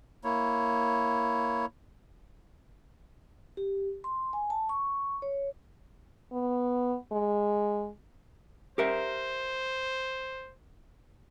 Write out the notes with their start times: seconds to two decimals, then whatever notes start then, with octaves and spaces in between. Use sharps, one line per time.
0.24 A#3 E4 C#5
3.57 G4
4.04 C6
4.33 G#5
4.50 A5
4.69 C#6
5.22 C#5
6.32 B3
7.12 G#3
8.78 G4 A#4 C5 E5